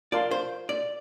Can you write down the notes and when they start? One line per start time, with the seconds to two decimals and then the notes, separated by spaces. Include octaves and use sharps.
0.12 F4 A#4 D5 F5 A5 C6
0.31 C5
0.69 D5